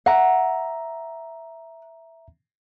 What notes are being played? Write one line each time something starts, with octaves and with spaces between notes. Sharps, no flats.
E5 F#5 A#5